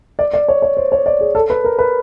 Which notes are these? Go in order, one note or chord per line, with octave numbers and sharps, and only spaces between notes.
D5
D5
C#5
C#5
C5
C#5
D5
G#4
A4
B4
A#4
B4